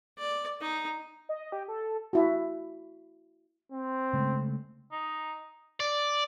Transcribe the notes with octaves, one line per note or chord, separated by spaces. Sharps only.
D5
D#4
D#5
G4
A4
E4 F#4
C4
C#3 G#3 A3
D#4
D5